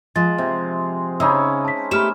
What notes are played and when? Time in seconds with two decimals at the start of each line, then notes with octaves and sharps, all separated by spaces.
0.16 F3 G#3 A6
0.38 C3
1.20 C#3 C#4 D#4 E4 B5 D#6 E6
1.65 A5 B6
1.91 A3 G4 E5 B5 F6 E7